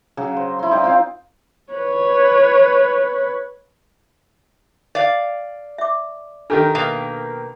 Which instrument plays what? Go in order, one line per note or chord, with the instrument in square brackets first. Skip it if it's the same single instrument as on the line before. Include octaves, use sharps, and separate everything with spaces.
[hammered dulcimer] C#3 F#3
C5
E4 C6
D#4 D5 F5 G5
C4 F4 F5
[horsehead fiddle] B4 C#5
[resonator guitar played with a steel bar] D5 F5
[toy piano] E5 D6
[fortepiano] D#3 G4 A#4 [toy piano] D4 A4
[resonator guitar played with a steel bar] B2 A#3